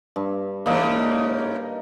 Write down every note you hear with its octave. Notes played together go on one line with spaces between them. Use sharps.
G2
G#2 C#3 E3 A#3 D#4 D5